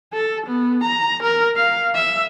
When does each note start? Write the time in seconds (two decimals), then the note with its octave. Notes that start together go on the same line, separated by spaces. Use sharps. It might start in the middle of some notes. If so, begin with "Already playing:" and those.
0.13 A4
0.46 B3
0.84 A#5
1.23 A#4
1.56 F5
1.95 E5